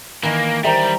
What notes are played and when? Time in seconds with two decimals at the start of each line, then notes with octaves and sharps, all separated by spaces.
0.23 D#3 E3 A#3
0.64 G3 A#4 C5 E5 G5 A#5